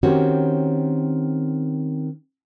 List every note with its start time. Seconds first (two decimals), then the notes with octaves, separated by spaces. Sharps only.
0.03 D#3 C4 C#4 F#4 G4 C#5